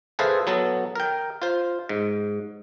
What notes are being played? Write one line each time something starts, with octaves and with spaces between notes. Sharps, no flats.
G#4 A4 B4 C5 E5 F5
F#3 B3 A4
A#4 G5
F4 C5
G#2